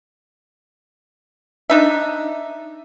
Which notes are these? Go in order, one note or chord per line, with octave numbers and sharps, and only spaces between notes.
D4 D#4 E5